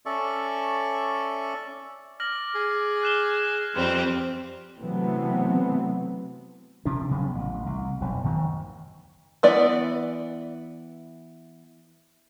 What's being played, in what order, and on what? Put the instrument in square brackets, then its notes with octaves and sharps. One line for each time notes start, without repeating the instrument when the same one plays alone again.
[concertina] C#4 A4 D5 E5 C#6
[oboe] D5 [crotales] F6 A#6 F#7
[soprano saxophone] G#4
[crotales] F#6 E7 G7
[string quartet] F2 G3 C4 [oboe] C6
[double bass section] C3 E3 F#3 A3 B3 C4
[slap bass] C3 F3 C#4 D4
E1 C#3 F#3 B3
A1
C2
F1 B1 F#2
F1 D2 D#3
[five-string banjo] E3 B3 D5